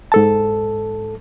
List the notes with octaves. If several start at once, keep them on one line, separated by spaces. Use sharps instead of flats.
G#2 A4 A5